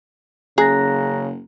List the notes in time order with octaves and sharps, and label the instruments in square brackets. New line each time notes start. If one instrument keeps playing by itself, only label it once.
[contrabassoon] F#1 [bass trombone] C#3 [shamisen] G#4 [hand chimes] A#5 F#6 A#6